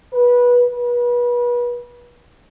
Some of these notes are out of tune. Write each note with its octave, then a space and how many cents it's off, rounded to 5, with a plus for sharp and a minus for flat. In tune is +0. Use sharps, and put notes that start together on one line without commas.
B4 -20
B4 -35